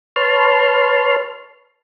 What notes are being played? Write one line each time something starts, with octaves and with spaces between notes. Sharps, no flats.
B4 C#5 A5 C6 F6